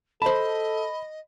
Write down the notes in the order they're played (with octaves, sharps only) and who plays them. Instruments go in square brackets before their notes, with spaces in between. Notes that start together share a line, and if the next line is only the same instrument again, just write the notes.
[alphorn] A4 [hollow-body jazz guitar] C5 A5 [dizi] D#5 [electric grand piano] B5